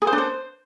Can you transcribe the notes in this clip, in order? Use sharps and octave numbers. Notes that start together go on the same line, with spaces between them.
G#4
C5
D4
C5